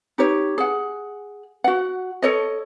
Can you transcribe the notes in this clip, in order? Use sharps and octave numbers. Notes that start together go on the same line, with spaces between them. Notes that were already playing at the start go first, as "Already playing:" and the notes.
D#4 G4 C#5
G#4 F#5
F#4 F#5
A4 C#5 D#5